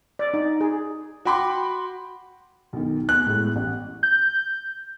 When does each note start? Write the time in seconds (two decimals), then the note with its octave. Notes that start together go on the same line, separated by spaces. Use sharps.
0.19 D5
0.34 D#4
0.61 G#4
1.25 F#4 G5 B5 C6 D6
2.73 B1 D#3
3.09 B3 F#6
3.26 A2 G#3 B3
3.55 A1
4.03 G6